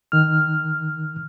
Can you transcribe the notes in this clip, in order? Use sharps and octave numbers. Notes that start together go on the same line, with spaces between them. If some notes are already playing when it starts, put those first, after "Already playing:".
D#3 F6